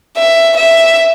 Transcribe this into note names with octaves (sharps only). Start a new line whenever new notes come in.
E5
E5